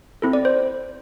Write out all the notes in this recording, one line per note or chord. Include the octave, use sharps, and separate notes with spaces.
C4 E4 A4
D5
C5